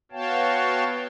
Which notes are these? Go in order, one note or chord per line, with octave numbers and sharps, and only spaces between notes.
B3 F#4 C#5 F5 G5 A5